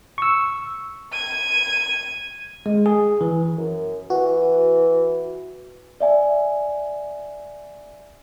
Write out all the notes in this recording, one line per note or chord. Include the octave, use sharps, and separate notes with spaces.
C#6 E6
G#6 D#7
G#3
G#4
E3
F#2
E3 F#4
D5 E5 G#5